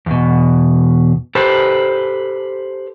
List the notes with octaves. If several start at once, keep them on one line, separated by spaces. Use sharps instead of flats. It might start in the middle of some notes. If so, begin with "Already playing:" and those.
E2 B2
G4 A4 B4 C5